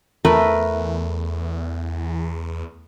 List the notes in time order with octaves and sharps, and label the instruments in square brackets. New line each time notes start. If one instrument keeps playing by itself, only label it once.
[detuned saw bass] E2 [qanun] A3 A#4 B4